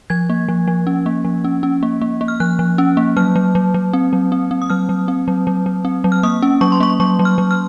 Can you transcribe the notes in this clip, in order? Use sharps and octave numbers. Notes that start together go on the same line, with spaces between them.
F3 G#6
A#3
F3
F3
C#4
A#3
F3
C#4
C#4
A#3
A#3
A#3
F6
F3 F#6
F3
C#4
A#3
F#3 F6
F#3
F#3
F#3
C4
F#3
C4
C4
D#6
F#3 F6
F#3
C4
F#3
F#3
F#3
C4
F#3
F6
A#3 D#6
C#4
F#3 C#6
C6
A#3 C#6
F#3 C#6
F#3
F6
F#3
F6